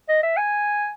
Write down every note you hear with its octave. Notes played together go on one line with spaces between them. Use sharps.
D#5
E5
G#5